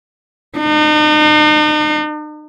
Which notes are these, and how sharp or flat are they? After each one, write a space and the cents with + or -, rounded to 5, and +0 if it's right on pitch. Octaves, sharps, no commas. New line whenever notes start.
D#4 -40